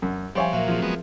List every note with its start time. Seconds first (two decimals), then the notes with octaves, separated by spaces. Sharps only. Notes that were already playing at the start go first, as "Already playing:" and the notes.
0.02 F#2
0.35 F3 G3 C5 C#5 E5 F5 G#5
0.53 A#2 F#3 A#4 E5 F5
0.68 F3 C4 G#4
0.82 F#3 G#3 B3